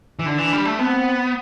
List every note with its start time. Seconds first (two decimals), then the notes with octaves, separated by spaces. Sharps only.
0.19 E3
0.26 D3 D4
0.38 E3
0.53 G3
0.65 A3
0.79 B3 C4